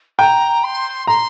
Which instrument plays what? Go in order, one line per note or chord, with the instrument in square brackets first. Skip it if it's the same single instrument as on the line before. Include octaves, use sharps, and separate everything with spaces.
[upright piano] G5 [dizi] A#5
[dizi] C6
[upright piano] A#5 [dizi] C6